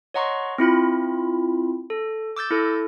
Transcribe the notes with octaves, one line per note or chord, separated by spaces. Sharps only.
C#5 D#5 F#5 A#5 C6 C#6
C4 E4 F4 B5
A4
D6 E6 G6 A6
E4 A4